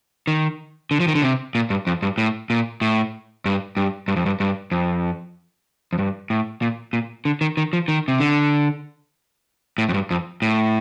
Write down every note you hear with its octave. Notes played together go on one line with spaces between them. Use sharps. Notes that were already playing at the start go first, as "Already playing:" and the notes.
D#3
D3
F3
D#3
D3
C3
A#2
G2
F2
G2
A2
A#2
A2
G2
G2
G2
F2
G2
G2
F2
F2
G2
A2
A#2
A#2
D3
D#3
D#3
F3
D#3
C3
D3
A2
F2
G2
F2
A2